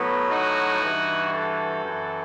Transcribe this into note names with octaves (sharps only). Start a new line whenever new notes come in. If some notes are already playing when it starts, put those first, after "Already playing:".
Already playing: A2 F#3 B3
D#4 F#4
G2 E3
F#4 A4
F#2 E3